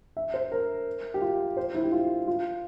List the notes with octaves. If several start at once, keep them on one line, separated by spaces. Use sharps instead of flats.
E5
C5
A#4
G4
F4
C5
E4
G4
F4
F4